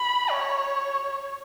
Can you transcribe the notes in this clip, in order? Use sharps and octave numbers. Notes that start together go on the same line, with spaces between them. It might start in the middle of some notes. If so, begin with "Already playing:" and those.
Already playing: B5
C#5